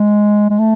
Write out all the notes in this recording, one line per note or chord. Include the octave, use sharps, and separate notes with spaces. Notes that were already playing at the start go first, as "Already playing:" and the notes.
Already playing: G#3
G#3
A3